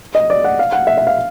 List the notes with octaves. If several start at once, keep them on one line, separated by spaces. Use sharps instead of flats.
D#5
D5
F#5
F5
F#5
E5
E5
F5